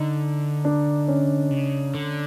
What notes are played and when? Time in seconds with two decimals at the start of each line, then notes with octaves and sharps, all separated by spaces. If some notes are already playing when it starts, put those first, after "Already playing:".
Already playing: D3 D#4
0.65 D4
1.08 C#4
1.51 C#3
1.95 D3